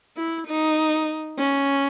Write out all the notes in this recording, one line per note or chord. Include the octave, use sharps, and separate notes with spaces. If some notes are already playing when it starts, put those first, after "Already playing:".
E4
D#4
C#4